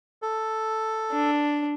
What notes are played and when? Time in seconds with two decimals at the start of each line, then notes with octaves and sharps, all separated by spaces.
0.22 A4
1.12 D4